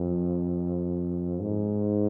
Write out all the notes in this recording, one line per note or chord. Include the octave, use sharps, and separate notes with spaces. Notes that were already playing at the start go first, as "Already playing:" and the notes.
Already playing: F2
G#2